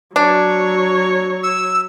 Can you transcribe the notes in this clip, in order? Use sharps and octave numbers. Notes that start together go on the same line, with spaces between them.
F#3 D4 C#5
E6